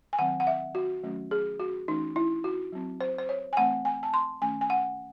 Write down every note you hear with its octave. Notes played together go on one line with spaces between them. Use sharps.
G#5
D#3 F#3 C4 F#5
F#5
E5
F#4
D#3 F#3 A3 C#4
G#4
F#4
E3 A3 C#4 D#4
E4
F#4
F#3 C4
C5
C5
C#5
G#5
E3 A3 C4 F#5
G#5
A5
C6
D#3 A3 C#4 G#5
G#5
F#5